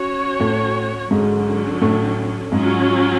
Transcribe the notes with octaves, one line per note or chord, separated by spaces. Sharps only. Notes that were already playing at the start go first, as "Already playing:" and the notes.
Already playing: C#4 F#4 C#5
A2 A3
G#2 D3 F#3 G#3 C#4
A2 A3
G#2 F#3 G#3 C#4 F4